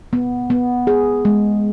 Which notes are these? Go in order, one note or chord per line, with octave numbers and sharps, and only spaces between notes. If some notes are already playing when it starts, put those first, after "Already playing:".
B3
B3
G#4
G#3